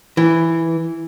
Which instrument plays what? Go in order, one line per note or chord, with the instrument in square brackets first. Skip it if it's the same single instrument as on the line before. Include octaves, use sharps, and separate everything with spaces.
[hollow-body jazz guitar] E3